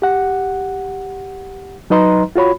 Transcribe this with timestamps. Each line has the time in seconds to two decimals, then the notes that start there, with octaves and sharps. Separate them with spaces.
0.02 G4 F#5
1.90 F#3 D#4 B4 D#5 A#5 C6
2.36 F4 F#4 C#5 B5